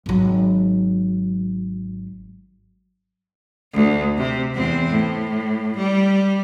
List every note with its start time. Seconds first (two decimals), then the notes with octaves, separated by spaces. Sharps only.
0.06 G#1 F#3
3.74 D2
4.18 C3
4.54 E2 C4
4.91 A2
5.77 G3